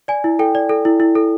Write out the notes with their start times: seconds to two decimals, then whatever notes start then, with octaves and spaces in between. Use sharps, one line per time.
0.08 D5 G#5
0.24 E4
0.39 A4 G5
0.55 D5
0.69 A4
0.85 E4
1.00 E4
1.15 A4